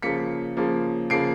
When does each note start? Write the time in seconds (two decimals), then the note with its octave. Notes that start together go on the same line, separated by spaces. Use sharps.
0.02 C#3 F3 A#3 B6 C#7
0.57 C#3 F3 A#3
1.10 C#3 F3 A#3 C7 D7